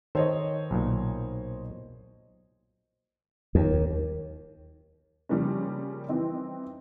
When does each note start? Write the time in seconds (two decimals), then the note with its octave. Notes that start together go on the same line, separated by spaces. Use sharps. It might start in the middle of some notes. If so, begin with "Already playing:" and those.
0.15 D#3 A4 C5 C#5 D#5
0.71 B1 A#2
3.55 D#2
5.29 C#3 F3 G3 A#3 C#4
6.09 E3 C4 D#4